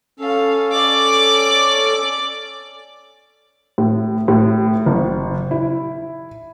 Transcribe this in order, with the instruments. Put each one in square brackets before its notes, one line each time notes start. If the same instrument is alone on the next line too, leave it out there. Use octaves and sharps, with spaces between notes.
[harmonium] C#4 A4 [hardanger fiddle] F5
[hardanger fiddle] D5 D6
[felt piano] A2
A2
F#1
E4